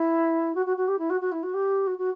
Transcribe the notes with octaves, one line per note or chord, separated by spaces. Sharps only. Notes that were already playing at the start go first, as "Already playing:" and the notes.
Already playing: E4
F#4
F#4
F#4
G4
E4
F#4
F#4
E4
F#4
G4
F#4
F#4